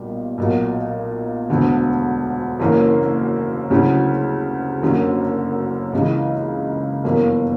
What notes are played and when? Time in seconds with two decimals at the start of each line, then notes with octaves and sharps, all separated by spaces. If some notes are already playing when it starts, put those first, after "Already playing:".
Already playing: B1 A#2 G3
0.38 B1 A#2 F#3
1.49 E1 D2 D3
2.59 F#1 F#2 E3 A#3 C#4
3.70 D2 C#3 F#3 C#4 E4
4.82 F#1 F#2 D3 F#3 C#4
5.93 C#2 C#3 E3
7.04 G1 F#2 E3 A#3